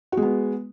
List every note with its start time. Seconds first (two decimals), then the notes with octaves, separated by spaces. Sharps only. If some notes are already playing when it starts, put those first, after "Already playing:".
0.12 F#4
0.17 G#3
0.22 B3